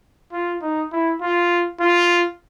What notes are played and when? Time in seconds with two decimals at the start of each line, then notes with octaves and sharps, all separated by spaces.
0.33 F4
0.62 D#4
0.92 E4
1.21 F4
1.80 F4